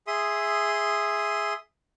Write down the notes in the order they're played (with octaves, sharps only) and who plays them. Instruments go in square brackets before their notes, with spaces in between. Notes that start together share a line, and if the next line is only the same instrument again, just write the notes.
[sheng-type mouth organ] G#4 E5 C6 D#6